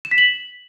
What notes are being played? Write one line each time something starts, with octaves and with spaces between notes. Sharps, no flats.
E7
B6
F#7